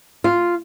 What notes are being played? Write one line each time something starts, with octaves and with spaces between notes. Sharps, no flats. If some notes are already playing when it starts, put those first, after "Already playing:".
F4